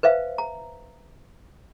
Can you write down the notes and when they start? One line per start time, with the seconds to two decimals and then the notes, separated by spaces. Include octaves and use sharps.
0.03 B4 C5 E5 F5
0.38 A#5